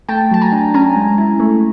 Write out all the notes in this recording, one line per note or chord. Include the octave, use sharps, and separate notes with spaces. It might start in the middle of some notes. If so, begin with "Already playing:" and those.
A3 G5 A5
F#3 A5
G#5 A#5
D4
C#4 G#5 A#5
G#3
E4
A3